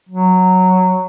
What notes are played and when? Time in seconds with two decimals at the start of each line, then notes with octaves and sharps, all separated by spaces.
0.09 F#3